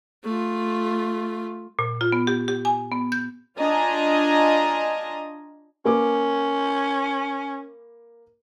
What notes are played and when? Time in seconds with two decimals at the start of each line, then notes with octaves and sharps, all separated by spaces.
0.24 A3 F4
1.79 A#2
2.01 F4
2.12 B3
2.27 G4
2.48 G4
2.65 G#5
2.92 B3
3.12 G6
3.59 D4 F4 D#5 G#5 A#5
5.85 A#3 C#4 B4 D6